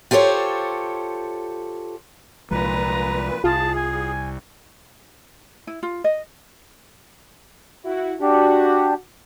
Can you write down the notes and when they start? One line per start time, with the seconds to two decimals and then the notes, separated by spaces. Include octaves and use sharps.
0.11 F4 G4 A4 C5 C#5
2.51 C2 A#2 F3 G#3 B4 A#5
3.44 C2 F4 G#4 A5
3.75 G#5
5.67 E4
5.83 F4
6.04 D#5
7.84 E4 F#4
8.21 D4 F#4 G4